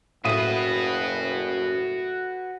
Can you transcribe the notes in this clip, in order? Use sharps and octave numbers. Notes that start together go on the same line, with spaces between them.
F#1 A2 F#4 B4 D#6 D#7